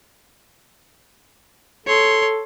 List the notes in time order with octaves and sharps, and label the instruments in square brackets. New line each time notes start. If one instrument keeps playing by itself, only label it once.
[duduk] A4 [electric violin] C#5 C6